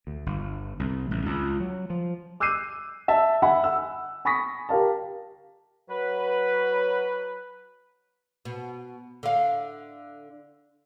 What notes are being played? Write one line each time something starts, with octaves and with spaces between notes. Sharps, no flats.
D2
G1
C2
A1
C#2
F#3
F3
D6 E6 F#6 G6 C7 D#7
E5 A5
E5 F#5 G#5 B5
F#5 E6
G#5 B5 C#6 D#6 A#6 B6
G4 A#4 F5 A5
F#3 B4
B2
D3 F5